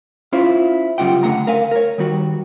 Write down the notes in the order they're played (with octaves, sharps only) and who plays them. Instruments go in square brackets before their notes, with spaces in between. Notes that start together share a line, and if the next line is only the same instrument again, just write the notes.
[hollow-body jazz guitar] C#4 E4 F4 C5 F5
F#2 C#3 G3 F4 F#5 G5
D3 A3 F#5 A#5
A#4 F5 G#5
A#4 C#5
D#3 G3 F#4